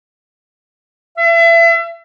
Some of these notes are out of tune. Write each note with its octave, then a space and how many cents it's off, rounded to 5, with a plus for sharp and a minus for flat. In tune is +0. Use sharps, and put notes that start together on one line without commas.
E5 +35